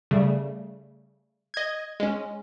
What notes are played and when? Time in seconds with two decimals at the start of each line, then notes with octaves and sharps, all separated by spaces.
0.11 C#3 G3 A3
1.54 D#5 G#6
2.00 G#3 C#4